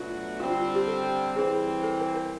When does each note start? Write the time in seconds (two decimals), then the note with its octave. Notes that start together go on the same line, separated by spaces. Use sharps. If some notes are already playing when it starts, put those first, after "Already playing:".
Already playing: B2 F#3 A3 D4 F4 F#4
0.40 D3 G3 C4 F4
0.52 F4
0.75 G4
0.88 A4
1.36 E3 G3 C4 G#4
1.83 A4
2.00 A#4
2.15 A#4